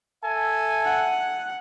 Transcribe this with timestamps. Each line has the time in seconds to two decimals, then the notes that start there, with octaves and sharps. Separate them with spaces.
0.24 A4 E5 G#5
0.85 F#5